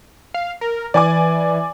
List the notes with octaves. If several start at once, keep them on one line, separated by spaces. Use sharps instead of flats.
F5
A#4
E3 D5 G#5 D6